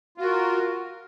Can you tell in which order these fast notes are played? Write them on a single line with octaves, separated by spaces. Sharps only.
F4 F#4 A#4